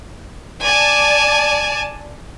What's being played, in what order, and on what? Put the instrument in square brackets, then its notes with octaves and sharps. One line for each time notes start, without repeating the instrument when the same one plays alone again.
[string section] D5 A5 [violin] G#5